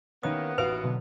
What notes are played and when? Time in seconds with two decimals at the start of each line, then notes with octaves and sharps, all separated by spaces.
0.23 D#2 D#3 E3 A#3 B3 C#4 D#6
0.58 A1 F#4 B4 F5 D7 F7
0.84 B2 D3 F#3